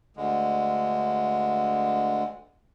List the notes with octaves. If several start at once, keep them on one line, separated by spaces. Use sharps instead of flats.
D2 D3 G#3